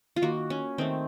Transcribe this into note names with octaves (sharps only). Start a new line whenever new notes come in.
F4
D#3 A#3 F#4
C#4
D#3 A3 C4